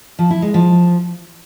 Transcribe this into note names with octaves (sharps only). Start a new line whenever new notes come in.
F3
E4
G#3
F3